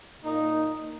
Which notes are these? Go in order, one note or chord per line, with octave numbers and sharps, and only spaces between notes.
A#2 A#3 D#4